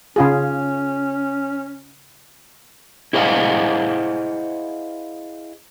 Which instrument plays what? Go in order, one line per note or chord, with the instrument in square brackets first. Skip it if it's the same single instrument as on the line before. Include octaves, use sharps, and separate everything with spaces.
[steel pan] C#3 F4 G#4 [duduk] C#4
[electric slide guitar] E4 G#4 C5 D#5 F5 F#5